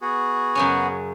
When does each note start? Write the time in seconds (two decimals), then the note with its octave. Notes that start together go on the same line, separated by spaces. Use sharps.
0.02 B3 F#4 G#4
0.55 F#2 C#3 C#4